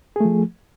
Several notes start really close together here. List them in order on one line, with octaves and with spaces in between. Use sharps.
G#4 A3 F3